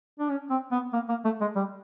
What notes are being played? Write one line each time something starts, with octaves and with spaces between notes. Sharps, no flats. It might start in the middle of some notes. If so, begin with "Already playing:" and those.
D4
C#4
C4
B3
A#3
A#3
A3
G#3
G3